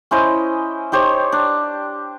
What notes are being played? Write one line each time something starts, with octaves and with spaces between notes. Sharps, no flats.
C#4 E4 C5 D#5
D#4 G4 C5 C#5
D4